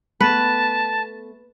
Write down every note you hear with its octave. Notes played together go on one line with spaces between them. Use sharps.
A3 B3 B4 A5